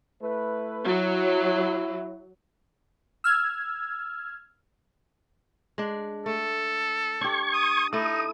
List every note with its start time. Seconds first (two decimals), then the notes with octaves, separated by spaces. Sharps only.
0.22 A3 E4 B4
0.88 F#3 E4
3.24 E6 F6 G#6
5.78 G#3 D4
6.26 A3 A4
7.21 D4 G4 C#6 G#6
7.53 D#6
7.93 A3 D#4 E4 D#6